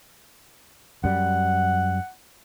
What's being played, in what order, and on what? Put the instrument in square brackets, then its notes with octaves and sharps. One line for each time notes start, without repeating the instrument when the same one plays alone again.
[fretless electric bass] F#2 G3 [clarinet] F#5